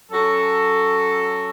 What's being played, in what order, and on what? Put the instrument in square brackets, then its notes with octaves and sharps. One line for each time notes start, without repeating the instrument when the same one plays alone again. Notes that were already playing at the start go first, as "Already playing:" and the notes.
[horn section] F#3 C#4 F#4 A4